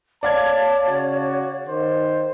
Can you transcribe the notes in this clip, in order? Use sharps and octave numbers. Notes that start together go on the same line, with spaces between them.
C#5 D5 F5 A5 G#6
C#3 F#4
D#3 C5